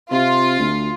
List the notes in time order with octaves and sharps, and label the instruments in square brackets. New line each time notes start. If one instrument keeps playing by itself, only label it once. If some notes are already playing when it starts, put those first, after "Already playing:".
[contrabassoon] C3 [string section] F4
[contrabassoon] D2